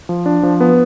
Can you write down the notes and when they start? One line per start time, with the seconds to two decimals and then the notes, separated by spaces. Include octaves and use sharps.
0.09 F3
0.26 D4
0.43 F3
0.61 B3